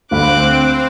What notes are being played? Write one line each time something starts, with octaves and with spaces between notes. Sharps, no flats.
D2 C4 F5 B5 D6 F#6